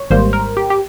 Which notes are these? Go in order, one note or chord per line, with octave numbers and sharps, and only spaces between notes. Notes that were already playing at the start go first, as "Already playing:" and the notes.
Already playing: C#5
G#1 G#2 G3 A#3 C5
A#4
G4
G4